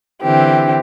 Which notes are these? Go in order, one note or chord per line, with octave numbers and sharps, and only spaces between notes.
D3 E3 C4 G4